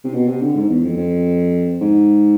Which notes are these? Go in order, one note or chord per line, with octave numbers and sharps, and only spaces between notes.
C3
B2
C3
D3
G#2
E2
F2
F2
G#2